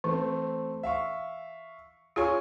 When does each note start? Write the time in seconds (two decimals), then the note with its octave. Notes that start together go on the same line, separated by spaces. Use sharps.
0.04 E3 A3 C4
0.83 E5 F5 C#6
2.16 F4 G#4 C#5 G#5 C#6